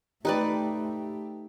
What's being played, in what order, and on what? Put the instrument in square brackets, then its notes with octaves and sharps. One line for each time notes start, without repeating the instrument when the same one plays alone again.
[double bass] A3 [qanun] D#4 B4 D5 [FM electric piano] G4 G5